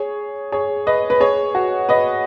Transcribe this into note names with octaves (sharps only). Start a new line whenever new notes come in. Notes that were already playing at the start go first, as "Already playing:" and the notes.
Already playing: G#4 C#5
G#4 C#5
B4 D#5
B4
G#4 C#5
F#4
B4 D#5